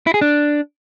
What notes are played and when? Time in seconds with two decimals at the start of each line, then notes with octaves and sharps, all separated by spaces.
0.07 E4
0.14 G#4
0.21 D4